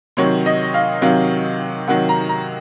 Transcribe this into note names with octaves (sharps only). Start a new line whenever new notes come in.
C3 D#3 F#3 C#5
D#5
F5
C3 D#3 F#3 F5
C3 D#3 F#3 F#5
A#5
A#5